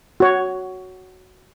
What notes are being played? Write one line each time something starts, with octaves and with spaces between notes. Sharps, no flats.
F#4 C#5